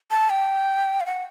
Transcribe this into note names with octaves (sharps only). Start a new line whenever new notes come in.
A5
G5
F5
F#5